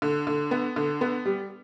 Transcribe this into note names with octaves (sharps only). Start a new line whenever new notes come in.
D3
D3
B3
D3
B3
G3